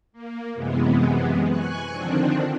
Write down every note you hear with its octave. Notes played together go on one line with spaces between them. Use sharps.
A#3
F#2 C3 E3 G#3 B3
G#5 C#6 F#6
D3 D#3 F3 C4 D4